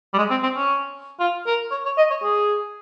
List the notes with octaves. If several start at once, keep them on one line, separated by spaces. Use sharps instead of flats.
G3
G#3
C4
C4
C#4
F4
A#4
C#5
C#5
D#5
C#5
G#4